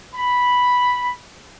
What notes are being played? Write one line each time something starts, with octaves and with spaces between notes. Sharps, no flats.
B5